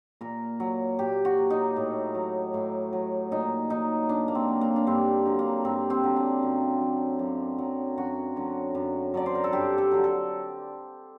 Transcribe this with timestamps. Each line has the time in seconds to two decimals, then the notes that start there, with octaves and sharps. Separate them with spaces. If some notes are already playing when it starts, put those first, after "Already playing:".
0.21 A#2 A#4
0.60 F#3
0.99 A#2 G4
1.25 F#4
1.37 F#3
1.50 D#4
1.76 A2
2.15 F#3
2.54 A2
2.93 F#3
3.31 A#2 D#4
3.70 F#3 D#4
4.09 A#2 D4
4.28 A#3
4.35 C4
4.48 F#3
4.61 A#3
4.76 D4
4.87 G2 C4
5.26 D3 F#3
5.39 A#3
5.64 G2 C4
5.90 C4
6.03 D3 F#3
6.16 D4
6.43 F#2
6.81 F#3
7.19 F#2
7.58 F#3
7.97 F#2 F#4
8.36 D3 F#3
8.75 F#2
9.14 D3 F#3 D5
9.26 C5
9.35 A#4
9.44 A4
9.52 G2 G4
9.78 A4
9.91 D3 F#3
10.04 A4